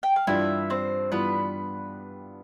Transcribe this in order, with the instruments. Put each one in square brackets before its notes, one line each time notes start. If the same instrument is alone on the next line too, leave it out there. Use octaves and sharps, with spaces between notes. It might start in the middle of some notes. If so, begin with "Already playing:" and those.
[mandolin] G5
F5
[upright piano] G2 E3 G3 D4 F4 [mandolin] E4 E5
[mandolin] C4 C5
[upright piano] G2 E3 G3 D4 F4 [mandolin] B3 B4